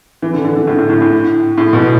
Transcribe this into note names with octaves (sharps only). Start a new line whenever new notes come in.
E3
D3
D3
D3
A2
A2
A2
A2
A2
B2